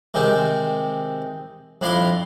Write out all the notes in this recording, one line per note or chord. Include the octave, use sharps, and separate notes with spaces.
C3 D#3 G#3 C4 D#4
F2 D4 E4 F5 A#5 C6